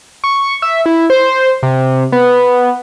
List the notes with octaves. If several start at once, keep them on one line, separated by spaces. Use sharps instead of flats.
C#6
E5
E4
C5
C3
B3